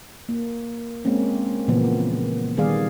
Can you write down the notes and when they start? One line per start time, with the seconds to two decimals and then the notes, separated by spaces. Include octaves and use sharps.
0.29 A#3
1.05 G#3 A#3 C4 C#4
1.68 A#2 C#3 E3 F3 A#3 B3
2.57 D#3 G3 B3 G#4 D5 F5